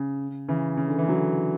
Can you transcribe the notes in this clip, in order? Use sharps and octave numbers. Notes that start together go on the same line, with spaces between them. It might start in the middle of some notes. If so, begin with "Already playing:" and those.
Already playing: C#3
C#3 E3
C#3
D3
E3
D3 F#3